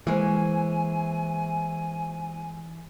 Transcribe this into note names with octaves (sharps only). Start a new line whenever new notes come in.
E3 G#3 A#3 C5 G#5 C#6